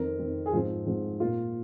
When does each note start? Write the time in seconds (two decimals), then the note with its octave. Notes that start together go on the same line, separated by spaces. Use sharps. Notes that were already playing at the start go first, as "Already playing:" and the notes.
Already playing: F2 D#3 C4 A#4
0.19 F2 D#3 C4
0.46 G#4
0.53 G#2 F3 C4 F4
0.86 G#2 F3 C4
1.20 A#2 A#3 F4